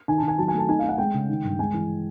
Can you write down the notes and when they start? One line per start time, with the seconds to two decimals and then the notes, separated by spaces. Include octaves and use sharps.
0.08 D#3 G#5
0.18 A5
0.23 D#3
0.28 G#5
0.38 F#3 A5
0.48 G#5
0.54 A3 A5
0.69 D#4 G#5
0.79 D#4 F5
0.89 F#5
0.98 G#3 G5
1.14 C#3
1.29 D#3
1.44 G2
1.59 G#3 G#5
1.73 E3